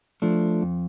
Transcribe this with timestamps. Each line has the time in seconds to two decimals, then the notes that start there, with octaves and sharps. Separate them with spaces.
0.22 F3 A3 D4
0.62 F2